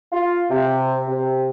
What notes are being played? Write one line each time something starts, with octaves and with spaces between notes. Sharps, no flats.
F4
C3
C3